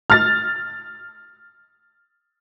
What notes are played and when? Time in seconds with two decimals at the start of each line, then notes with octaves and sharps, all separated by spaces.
0.10 F6 A6